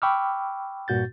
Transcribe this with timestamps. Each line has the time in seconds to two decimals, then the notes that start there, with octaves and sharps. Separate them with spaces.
0.02 G5 B5 C#6 D6 E6 F6
0.88 G2 A#2 F#4 G6 A6